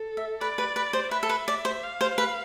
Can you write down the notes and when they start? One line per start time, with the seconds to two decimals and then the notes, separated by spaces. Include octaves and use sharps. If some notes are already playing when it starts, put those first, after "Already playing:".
Already playing: A4
0.17 E5
0.41 B4 D5
0.58 B4
0.76 B4
0.93 C5
1.11 B4 E5
1.23 A4
1.29 B4
1.48 D5
1.65 C5
1.83 F5
2.01 C5
2.18 B4